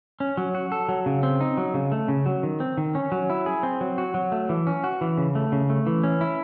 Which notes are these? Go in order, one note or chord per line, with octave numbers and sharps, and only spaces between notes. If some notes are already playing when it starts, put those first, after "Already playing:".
C#4
F#3
F#4
A4
F#3
C#3
C4
D#4
F#3
C#3
A3
C#3
F#3
D#3
C4
D#3
C#4
F#3
E4
G#4
C4
F#3
F#4
F#3
A3
E3
C#4
F#4
E3
C#3
A3
C#3
A3
E3
C#4
E4